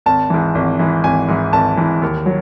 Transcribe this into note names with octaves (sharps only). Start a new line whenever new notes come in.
G#1 A5
G#2 E3
G#1
G#2 E3
G#1 G#5
G#2 E3
G#1 A5
G#2 E3
D#2
F#3